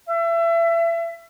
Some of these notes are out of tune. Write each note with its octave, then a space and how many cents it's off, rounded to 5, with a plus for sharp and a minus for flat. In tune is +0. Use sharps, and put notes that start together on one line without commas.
E5 +30